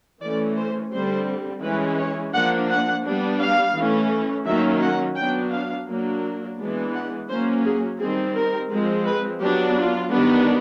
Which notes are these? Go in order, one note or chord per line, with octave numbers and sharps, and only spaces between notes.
E3 A3 C#4 D5
C5
D3 G3 C4 C5
E3 G#3 C#4 B4
C#5
F3 A#3 D4 F#5
F#5
G3 B3 D4
F5
E3 A3 C#4
D#3 F#3 A#3 C#4 E5
F#5
F#3 B3 D4 G5
F5
F#3 A#3 D4
E3 G#3 B3 D4
F#5
F#3 A#3 C#4 C5
G#4
D#3 G3 C4 G#4
A#4
F3 G#3 C4
B4
F#3 B3 D4 G4
F4
D#3 G3 B3 D4